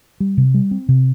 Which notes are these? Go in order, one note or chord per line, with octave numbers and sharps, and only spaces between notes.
G3
C3
G3
C4
C3